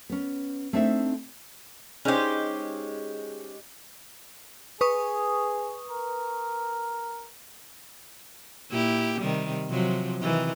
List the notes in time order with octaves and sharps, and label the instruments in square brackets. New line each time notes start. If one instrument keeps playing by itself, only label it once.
[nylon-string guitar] B3 C#4
A3 C4 D4 D#4 E5
[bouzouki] G#3 G4 [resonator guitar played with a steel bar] C#4 D#4 C5
[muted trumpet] G#4 [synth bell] B4 C#6 D#6
[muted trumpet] A#4
[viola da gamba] A#2 E4 G4
C3 D#3 G3
C3 F3 F#3
C3 D#3 E3